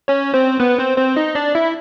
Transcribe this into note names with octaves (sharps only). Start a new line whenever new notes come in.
C#4 C#5
C4 C5
B3 B4
C4 C5
C4 C5
D#4 D#5
D4 D5
E4 E5